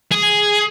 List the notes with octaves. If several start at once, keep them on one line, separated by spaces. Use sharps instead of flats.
G#4